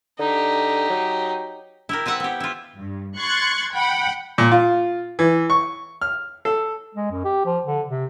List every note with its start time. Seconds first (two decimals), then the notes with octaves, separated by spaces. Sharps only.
0.19 D3 D#4 G4
0.90 F#3
1.89 E4 G4 A#4
2.06 C4 B4 E5 F#5
2.20 B3 G4
2.40 E4 F4
2.76 G2
3.17 C6 C#6 F#6 G#6 A6
3.74 F#5 G5 B5
4.38 A#2
4.51 F4
5.19 E3
5.50 C#6
6.01 F6
6.45 A4
6.95 G#3
7.11 F#2
7.25 G4
7.46 F3
7.65 D3
7.89 C3